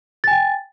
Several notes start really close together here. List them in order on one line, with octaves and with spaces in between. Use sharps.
A6 G#5 G5